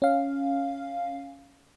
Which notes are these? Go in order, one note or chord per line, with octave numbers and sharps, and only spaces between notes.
C#4 F5